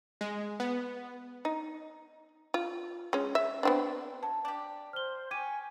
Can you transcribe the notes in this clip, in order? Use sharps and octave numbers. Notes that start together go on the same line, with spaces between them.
G#3
B3
D#4
F4
G#3 C#4
E5
B3 C4 D4
F#3 A5
D4 G4
C5 F6 G7
G4 G#5 C#6 G#6 D#7